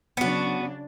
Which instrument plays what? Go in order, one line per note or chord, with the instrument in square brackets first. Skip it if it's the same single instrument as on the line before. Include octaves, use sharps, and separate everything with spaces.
[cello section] C#3 F#3 D4 [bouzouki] B3 F#4